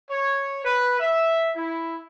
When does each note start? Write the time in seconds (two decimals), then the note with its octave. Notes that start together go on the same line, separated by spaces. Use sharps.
0.10 C#5
0.64 B4
1.00 E5
1.56 E4